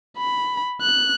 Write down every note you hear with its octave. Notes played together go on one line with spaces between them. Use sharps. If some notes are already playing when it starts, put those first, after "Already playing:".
B5
F#6